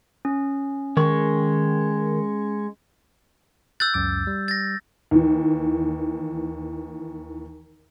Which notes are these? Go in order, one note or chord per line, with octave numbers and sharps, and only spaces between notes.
C#4
D#3 G#3 C#6
E6 F#6 G6 A6
C#2 F#2 D6
G3
A6 A#6
D#2 E3